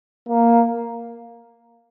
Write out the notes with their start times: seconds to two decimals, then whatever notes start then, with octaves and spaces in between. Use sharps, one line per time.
0.28 A#3